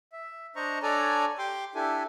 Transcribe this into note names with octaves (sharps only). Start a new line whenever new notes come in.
E5
D4 C5 D#5 A#5 C#6
D4 A4 C#5 D5 G#5 A#5
G4 G5 C6 D6
D4 E4 G4 A4 G#5